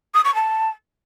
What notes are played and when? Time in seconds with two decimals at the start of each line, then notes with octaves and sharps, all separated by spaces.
0.14 D#6
0.24 C#6
0.35 A5